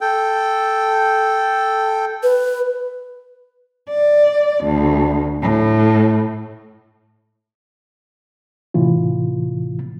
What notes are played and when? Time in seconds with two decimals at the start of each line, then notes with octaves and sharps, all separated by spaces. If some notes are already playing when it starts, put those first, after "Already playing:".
0.01 A4 G5
2.23 B4
3.90 D5
4.64 D2
5.42 A2
8.74 A2 C3 E3 F4